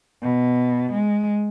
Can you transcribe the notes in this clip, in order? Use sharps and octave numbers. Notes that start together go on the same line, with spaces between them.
B2
G#3